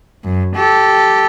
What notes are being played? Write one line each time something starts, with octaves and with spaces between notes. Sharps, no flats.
F#2
G4 A4